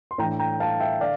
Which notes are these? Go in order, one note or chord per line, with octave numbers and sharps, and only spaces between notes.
C6
A2 E3 A3 D4 G5 A#5
G5 A#5
F5 A5
E5 G5
D3 D5 F5